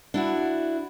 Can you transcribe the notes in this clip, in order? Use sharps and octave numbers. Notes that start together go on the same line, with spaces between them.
D4 E4 F#4